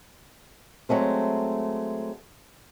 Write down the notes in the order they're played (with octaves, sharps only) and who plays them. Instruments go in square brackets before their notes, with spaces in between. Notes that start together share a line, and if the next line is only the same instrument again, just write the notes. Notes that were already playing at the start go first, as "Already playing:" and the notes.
[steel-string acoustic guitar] F#3 G#3 A3 C4